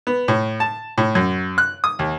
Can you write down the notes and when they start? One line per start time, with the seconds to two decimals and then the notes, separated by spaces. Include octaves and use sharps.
0.07 B3
0.28 A2
0.60 A5
0.98 A2
1.15 F#2
1.58 F#6
1.84 D#6
1.99 D#2